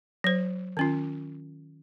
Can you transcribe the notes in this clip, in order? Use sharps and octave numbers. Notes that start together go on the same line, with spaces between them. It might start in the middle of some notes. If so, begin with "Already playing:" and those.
F#3 C5
D#3 C#4 F4